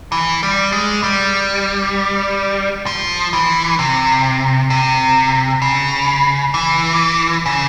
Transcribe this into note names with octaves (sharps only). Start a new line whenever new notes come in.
E3
G3
G#3
G3
F3
E3
C3
C3
C#3
E3
C#3